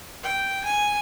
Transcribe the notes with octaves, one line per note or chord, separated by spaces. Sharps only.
G5
G#5